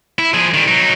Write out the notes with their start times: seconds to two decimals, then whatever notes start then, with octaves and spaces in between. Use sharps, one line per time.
0.19 E4
0.34 F3 G#4
0.54 D#3 G3
0.68 F#3 D#4